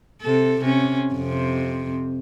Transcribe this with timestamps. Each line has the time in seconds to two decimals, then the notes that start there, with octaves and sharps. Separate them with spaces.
0.22 C3 A4
0.61 C3 C#4
1.14 F2 C3